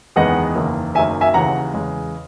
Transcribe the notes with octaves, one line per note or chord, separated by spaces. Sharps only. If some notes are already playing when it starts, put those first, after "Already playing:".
F#1 E2 D#3 G#3 B3 D#5 F#5
F#1 E2 D#3 A#3
F#1 F#2 D#3 A#3 E5 G#5
E5 G#5
D#2 C#3 E3 F#5 A#5
E2 C#3 G#3